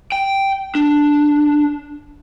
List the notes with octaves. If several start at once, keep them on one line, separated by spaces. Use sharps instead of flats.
G5
D4